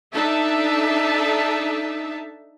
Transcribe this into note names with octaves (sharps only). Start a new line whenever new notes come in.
D4 D#4 A4 E5 A5